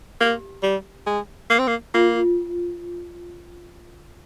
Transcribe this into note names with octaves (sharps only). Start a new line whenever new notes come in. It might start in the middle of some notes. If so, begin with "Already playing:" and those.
A#3 G4
G3
G#3
A#3
C4
A#3
A#3 F4